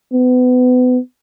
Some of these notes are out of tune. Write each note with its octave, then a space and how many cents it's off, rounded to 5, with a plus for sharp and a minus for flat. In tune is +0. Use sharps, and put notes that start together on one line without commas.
B3 +30